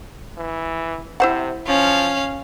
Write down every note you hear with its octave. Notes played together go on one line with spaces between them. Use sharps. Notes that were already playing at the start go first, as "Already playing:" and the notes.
E3
C3 E4 C5 F#5
F3 C#4 F5